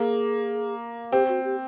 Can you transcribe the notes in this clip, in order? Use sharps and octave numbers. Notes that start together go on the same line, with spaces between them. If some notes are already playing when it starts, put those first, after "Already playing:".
Already playing: A#3 G#4
C4 G4
F#4
G4